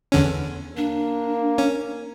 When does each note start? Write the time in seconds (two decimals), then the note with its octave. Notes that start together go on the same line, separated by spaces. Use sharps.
0.12 E2 D3 C#4
0.77 A#3 D4
1.58 C#4